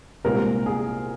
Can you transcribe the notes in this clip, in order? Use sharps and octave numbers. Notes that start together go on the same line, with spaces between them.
C2 A#2 G#3 C4 A#4
G#4